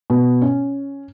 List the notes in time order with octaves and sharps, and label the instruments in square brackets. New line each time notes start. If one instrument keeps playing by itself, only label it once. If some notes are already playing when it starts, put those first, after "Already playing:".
[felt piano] B2
C#4